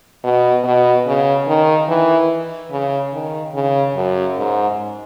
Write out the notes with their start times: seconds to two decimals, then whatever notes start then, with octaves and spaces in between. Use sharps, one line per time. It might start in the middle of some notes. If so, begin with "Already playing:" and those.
0.24 B2
0.64 B2
1.06 C#3
1.48 D#3
1.89 E3
2.71 C#3
3.13 D#3
3.54 C#3
3.96 F#2
4.38 G#2